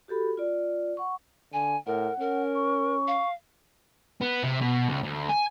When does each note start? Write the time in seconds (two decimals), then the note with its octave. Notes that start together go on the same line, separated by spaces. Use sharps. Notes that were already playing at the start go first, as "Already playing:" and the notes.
0.08 F#4 G4 A4 B5
0.37 F4 D5
0.97 F#5 C#6
1.53 D3 G#5
1.87 A2 A#4 F#5
2.20 C#4 A#4
2.55 C#6
3.07 F5
4.21 B3
4.43 C3
4.61 B2
4.89 C#2
5.03 D2
5.29 G#5